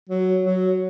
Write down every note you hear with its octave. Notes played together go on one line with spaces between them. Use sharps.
F#3
F#3